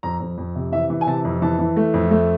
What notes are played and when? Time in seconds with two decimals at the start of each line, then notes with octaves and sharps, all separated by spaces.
0.03 F2 A#5
0.20 F2
0.38 F2
0.55 C3
0.72 E3 E5
0.90 E3
1.01 G#5
1.07 C3 A5
1.25 F2
1.42 E3 A5
1.59 E3
1.77 A3
1.94 F2
2.11 A3